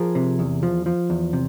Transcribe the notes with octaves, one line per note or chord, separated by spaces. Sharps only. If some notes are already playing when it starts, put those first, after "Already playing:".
Already playing: F3 G#4 A#4
C3
E2
F3
F3
E2
C3